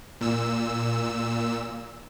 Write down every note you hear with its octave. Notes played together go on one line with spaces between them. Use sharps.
A#2 E6